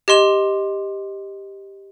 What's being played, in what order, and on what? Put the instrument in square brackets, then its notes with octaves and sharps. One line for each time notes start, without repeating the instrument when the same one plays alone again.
[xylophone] G4 D#5 C6 E7